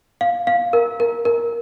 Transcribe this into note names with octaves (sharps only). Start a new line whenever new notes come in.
F5
F5
A#4
A#4
A#4